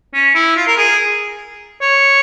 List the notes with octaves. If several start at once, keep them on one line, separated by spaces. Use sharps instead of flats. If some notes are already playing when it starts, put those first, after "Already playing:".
C#4
E4
F4
A#4
G#4
C#5